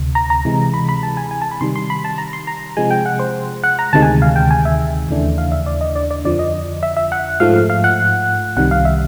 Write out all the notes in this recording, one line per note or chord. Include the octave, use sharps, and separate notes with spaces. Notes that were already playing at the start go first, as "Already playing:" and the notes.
Already playing: D2 C3
A#5
A#5
C3 E3 G#3
B5
B5
A5
G#5
G#5
A5
B5
C3 D#3 G3 C6
C6
B5
A5
A#5
C6
A#5
C3 F3 G#3 G#5
G5
F#5
C5
F#5
A#5
D2 C3 D#3 G#3 A5
G#5
F5
G5
G#5
E5
D#2 C#3 E3 A3 D4
F5
E5
D5
D#5
D5
D5
F2 D3 F3 D5
D#5
E5
E5
F#5
G#2 F3 A3 F5
F5
F#5
C2 C3 D#3 G3 F#5
F5
E5